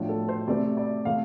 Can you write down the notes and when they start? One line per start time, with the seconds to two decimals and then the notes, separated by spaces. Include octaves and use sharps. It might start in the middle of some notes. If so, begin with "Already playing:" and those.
Already playing: A2 F3 D4
0.09 A4
0.29 C5
0.48 C3 A3 C4 D5
0.77 D5
1.05 C3 A3 C4 F5